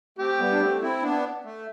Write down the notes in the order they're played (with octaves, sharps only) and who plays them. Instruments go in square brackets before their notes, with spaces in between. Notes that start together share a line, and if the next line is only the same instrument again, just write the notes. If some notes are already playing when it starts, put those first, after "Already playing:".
[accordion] A3 C4 [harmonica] G4
[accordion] G3 B3
D4
A3 C4
C4 E4
B3 D4
A3